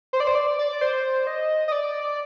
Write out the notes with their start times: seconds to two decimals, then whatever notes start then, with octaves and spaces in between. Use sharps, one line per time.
0.13 C5
0.20 D5
0.27 C5
0.35 D5
0.59 D5
0.81 C5
1.27 D#5
1.68 D#5
1.72 D5